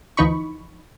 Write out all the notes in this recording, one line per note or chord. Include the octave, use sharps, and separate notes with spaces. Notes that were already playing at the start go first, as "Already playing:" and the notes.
D2 E3 F3 D#4 B5 C#6